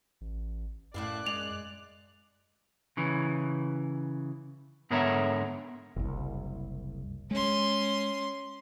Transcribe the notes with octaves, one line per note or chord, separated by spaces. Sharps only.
A1
F#2 A2 E4 D5 F5 F#6
G#3 F7
C#3 E3
G#2 D3 B3 A#4 C#5 E5
F#1 C2
G#3 C#4 C6